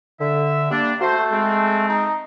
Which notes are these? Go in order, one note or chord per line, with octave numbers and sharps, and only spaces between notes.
D3 E5
G3 A#3 D4
A3 F#4 C5
G#3 C4
D#4